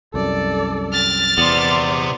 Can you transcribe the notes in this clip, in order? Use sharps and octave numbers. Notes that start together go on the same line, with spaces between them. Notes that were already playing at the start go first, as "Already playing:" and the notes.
C2 F#2 A4 D5
F6 A6
E2 C3 B3 D5 C6